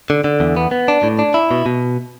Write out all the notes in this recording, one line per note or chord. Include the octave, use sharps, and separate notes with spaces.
D3
D3
E2
B3
B3
D4
A2
D4
E4
B2
B2